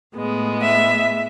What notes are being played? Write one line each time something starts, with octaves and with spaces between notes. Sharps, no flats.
A2 G#3 B3
E5